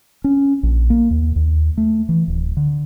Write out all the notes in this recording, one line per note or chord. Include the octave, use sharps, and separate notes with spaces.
C#4
A#1
A#3
D#2
D#2
A3
E3
D1
D3